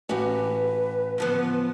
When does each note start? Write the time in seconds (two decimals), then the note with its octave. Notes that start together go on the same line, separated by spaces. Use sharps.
0.09 A1 F#4 G4 B4
1.18 D3 F3 B3